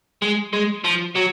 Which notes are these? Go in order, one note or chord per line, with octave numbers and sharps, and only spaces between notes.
G#3
G#3
F3
F#3